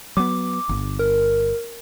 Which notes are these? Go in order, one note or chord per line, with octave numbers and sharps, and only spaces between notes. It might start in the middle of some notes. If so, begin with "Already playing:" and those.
F#3 B3 D6
G1
A#4